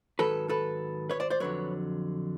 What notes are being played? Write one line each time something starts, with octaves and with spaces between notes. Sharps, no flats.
G#2 D#3 F#3 A4 B4
A4 B4
B4 C#5
C5 D5
C5 D5
F2 D3 F#3 B4 C#5